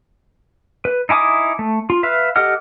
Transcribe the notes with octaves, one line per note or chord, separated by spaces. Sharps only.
B4
D#4 E4 G#5 D6 D#6
A3
F4
B4 E5 F5
G4 A4 D#5 F#5 F6